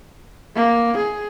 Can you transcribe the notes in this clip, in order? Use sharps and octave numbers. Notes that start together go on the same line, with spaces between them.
A#3
G#4